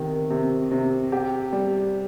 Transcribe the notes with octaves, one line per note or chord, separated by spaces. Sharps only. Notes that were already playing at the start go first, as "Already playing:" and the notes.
Already playing: C3 D#3
C3
C3
G4
G3